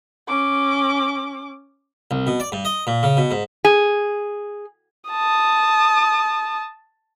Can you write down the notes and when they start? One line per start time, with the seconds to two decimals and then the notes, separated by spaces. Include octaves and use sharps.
0.28 C#4 D6
2.11 C2
2.27 B2
2.40 D5
2.52 G2
2.65 D#5
2.87 A#2
3.03 C#3
3.17 B2
3.31 G#2
3.65 G#4
5.10 A5 D#6